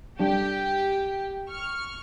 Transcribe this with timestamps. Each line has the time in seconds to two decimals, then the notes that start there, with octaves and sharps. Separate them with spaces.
0.20 G3 D4 G4
1.50 C#6 F6